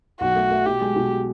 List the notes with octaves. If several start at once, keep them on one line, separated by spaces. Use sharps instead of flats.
B1 F#4
A3
A3
B2 G4
G#3
B2